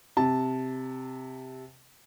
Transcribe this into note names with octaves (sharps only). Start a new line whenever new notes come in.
C3 A5